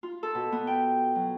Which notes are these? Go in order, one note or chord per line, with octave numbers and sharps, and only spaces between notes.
F4
A4
B2
B3
G5
F#3